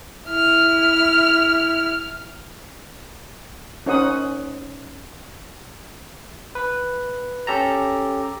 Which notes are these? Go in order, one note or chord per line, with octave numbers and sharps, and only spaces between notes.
E4 F6
C#4 D#4 A#4 C5 F#5 D#6
B4
C#4 G4 A4 A5 A#5